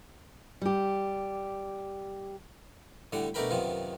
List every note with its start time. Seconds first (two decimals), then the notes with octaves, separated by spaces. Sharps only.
0.61 G3 G4
3.12 A2 D3 G3 F#5
3.34 B2 A3 D4 A#4 G5 B5
3.51 F#2 C3 D#3 B3 F4